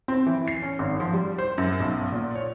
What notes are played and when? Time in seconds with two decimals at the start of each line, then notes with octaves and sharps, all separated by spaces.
0.08 C4
0.26 E3
0.48 C7
0.62 C#4
0.79 G#1
1.00 F3
1.14 G3
1.38 C5
1.58 F#2
1.80 B1
2.12 A#2
2.35 C#5